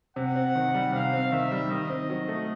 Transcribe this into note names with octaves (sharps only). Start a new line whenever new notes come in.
C3 F#5
C4
D#3
G3
C3 F5
C4
D#3 E5
G3
D#3 D#5
C4
F#3
A3